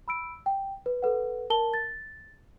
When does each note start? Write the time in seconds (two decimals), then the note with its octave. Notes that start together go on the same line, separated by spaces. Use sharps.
0.08 B5 E6 D7
0.46 G5
0.86 B4
1.02 A4 B4 F#5
1.50 A#4 A5 G7
1.74 A6